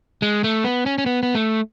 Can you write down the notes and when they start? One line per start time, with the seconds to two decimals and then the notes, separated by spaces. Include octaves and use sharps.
0.22 G#3
0.44 A3
0.64 B3
0.86 C#4
0.98 C#4
1.06 B3
1.23 B3
1.35 A3